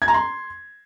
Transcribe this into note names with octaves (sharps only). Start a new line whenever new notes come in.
G#6
A#5
C6